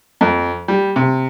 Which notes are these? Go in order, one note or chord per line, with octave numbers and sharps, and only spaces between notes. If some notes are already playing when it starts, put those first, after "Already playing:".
F2
G3
C3